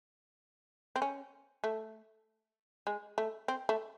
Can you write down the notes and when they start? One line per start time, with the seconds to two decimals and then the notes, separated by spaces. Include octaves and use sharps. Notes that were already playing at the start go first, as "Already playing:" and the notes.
0.96 C4
1.02 C#4
1.64 A3
2.87 G#3
3.18 A3
3.48 C4
3.69 A3